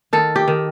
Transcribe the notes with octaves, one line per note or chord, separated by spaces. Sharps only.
D#3 A4
G4
D#3